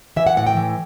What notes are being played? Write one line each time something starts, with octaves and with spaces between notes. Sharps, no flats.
E3 E5
F#5
A2 F#5
G5
E3